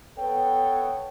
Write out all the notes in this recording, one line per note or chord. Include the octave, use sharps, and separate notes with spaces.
B3 A4 B4 C#5 G5